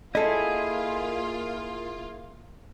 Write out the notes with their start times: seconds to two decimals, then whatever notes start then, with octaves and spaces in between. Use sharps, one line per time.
0.15 A#3 E4 F4 G#4 A4 D#5